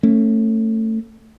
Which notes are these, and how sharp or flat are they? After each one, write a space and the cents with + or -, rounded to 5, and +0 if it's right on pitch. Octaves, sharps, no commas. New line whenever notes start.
A3 +20 C#4 -20